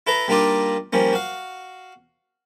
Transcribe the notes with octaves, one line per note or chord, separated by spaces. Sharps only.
E4 A4 B4 A#5
G3 A#3 D4 D#4 F4 D5
F3 G3 A#3 C#4
F#4 F5